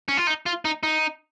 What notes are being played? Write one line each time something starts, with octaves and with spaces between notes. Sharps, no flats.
C#4
F4
D#4
F4
D#4
D#4